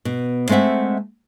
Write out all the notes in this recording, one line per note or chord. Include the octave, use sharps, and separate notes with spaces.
B2
G#3 A3 C4 E5 F#5